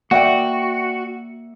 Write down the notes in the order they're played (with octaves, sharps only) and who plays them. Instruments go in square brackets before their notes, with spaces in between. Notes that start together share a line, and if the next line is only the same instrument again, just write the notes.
[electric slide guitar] A#3 D5 E5 [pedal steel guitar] F#4 [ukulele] F#5 G5